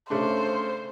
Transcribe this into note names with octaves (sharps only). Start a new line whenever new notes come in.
C#3 A3 D4 C5